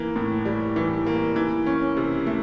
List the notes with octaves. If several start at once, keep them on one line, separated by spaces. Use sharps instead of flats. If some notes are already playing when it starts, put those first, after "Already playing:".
Already playing: E3 A#3
A2
G3
E3
A#3
E3
C#4
C3
A3